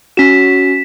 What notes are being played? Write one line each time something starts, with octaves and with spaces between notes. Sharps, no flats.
C#4 F#4 B6 E7